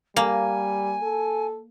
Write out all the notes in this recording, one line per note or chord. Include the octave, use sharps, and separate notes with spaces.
G3 A#3 G#5
A4